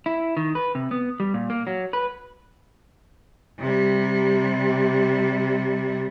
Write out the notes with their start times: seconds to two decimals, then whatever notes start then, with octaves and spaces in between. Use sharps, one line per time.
0.06 E4
0.37 D#3
0.55 B4
0.75 C3
0.91 B3
1.20 G3
1.34 A#2
1.50 A#3
1.67 F#3
1.93 B4
3.59 C3 G3